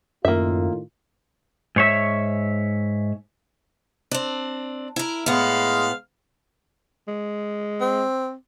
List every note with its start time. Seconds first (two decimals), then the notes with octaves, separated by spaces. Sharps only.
0.25 F#2 A2 D#3 A#3 F4 E5
1.76 G#2 C#5 E5
4.11 C4 D4
4.96 E4 A#4
5.26 A2 G#3 B3 F5
7.08 G#3
7.80 C4